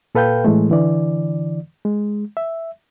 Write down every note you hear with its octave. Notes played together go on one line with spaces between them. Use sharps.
A#2 A4 B4 F5 G5 G6
A2 E3 G#3 A3
D3 E3 D5
G#3
E5